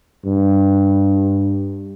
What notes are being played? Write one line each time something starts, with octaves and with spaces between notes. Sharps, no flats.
G2